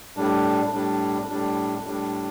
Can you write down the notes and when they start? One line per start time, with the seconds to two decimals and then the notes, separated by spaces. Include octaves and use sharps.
0.17 A2 G3 D4
0.73 A2 G3 D4
1.29 A2 G3 D4
1.86 A2 G3 D4